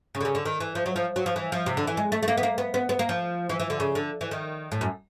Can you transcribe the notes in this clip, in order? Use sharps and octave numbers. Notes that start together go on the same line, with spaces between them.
C#3
D3
C#3
D3
D#3
E3
F3
F#3
F3
F#3
F3
E3
F3
C3
D3
E3
G#3
A3
A3
A#3
B3
A#3
B3
B3
B3
A#3
F3
E3
E3
D3
C#3
D3
E3
D#3
A2
F#2